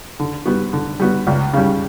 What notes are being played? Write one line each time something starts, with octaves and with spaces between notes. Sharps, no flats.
D3
G3 B3 F#4
D3
G3 B3 F#4
C#2
C#3 G3